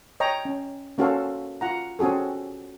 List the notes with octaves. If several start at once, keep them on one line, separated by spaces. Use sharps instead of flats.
C#5 D#5 G5 A#5
C#4
A#3 C#4 F#4 A4 C5 F5
F4 F#5 A#5
C4 C#4 F#4 G#4 A4